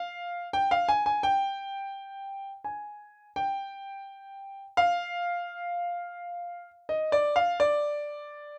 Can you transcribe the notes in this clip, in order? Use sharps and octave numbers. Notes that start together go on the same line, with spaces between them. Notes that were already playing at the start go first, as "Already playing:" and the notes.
Already playing: F5
G5
F5
G#5
G#5
G5
G#5
G5
F5
D#5
D5
F5
D5